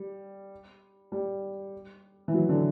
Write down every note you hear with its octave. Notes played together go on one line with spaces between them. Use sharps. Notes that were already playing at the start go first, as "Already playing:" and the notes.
Already playing: G3
G3
E3
F#3
D3